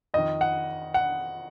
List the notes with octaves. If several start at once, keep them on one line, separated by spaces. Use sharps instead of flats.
F2 D#3 D#5
F#5
F#5